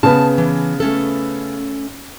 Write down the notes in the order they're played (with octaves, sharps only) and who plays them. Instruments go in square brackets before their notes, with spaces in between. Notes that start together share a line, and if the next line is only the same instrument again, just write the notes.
[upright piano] C#3 B3 [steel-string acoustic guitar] A5
[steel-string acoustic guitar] E3
A3 C#4 A4